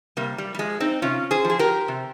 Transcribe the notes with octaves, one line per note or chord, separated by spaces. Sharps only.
C3 G3 A#3
G3
G3
F3 G#3
C4 D#4
C3 C#4 F4
G#4 C5
F3 G#4
G4 A#4
C3